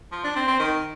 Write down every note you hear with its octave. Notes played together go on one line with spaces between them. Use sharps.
F3
D4
C4
C4
D#3